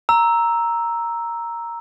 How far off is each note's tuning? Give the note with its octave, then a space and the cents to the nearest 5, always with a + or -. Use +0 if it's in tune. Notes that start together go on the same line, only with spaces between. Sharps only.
A#5 +0 E6 -5